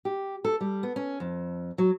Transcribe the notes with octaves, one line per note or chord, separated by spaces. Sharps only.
G4
A4
G3
B3
C#4
F2
F#3